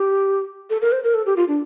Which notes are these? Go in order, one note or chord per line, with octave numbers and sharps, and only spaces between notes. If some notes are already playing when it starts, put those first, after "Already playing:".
Already playing: G4
A4
A#4
C5
A#4
A4
G4
F4
D4